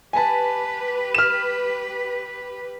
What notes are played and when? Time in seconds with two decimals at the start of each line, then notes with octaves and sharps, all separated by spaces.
0.13 G4 B4 G#5 A5
1.15 F6 E7